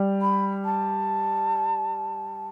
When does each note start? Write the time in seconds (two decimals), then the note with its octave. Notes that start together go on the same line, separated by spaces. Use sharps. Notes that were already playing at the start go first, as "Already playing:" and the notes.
Already playing: G3
0.21 B5
0.65 A5